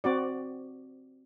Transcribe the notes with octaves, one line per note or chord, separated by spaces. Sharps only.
C4 F#4 D5